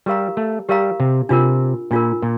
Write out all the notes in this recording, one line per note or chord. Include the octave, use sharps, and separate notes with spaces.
G3 G4 A#4 F5 A#5
A3
G3 G4 A#4 F5 A#5
C3
C3 D4 F4 A#4
A#2 D4 F4 A#4
A#2